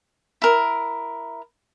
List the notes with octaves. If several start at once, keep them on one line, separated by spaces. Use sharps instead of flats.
E4 A#4